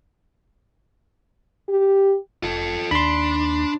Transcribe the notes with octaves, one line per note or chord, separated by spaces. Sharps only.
G4
F1 F4 A4
D#2 D4 B5 C6